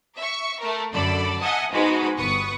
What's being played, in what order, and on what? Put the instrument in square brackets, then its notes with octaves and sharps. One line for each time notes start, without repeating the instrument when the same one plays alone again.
[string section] E5 C#6
A3 A#4
F#2 D3 A4 D5 B5
D#5 E5 F#5 G#5 A5 D#6
G#2 B2 G#3 D#4 F#4 B5
G1 B3 B4 C#6 D#6 C#7